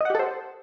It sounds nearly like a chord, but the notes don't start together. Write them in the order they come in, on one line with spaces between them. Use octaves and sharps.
D#5 F#5 G4 A4 C5